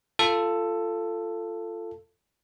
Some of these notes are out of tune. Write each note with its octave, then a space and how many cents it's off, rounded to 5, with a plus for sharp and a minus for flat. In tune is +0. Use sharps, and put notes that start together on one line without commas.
F4 -15 A4 +10